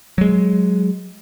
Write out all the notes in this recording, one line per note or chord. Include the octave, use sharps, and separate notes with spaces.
F#3 G#3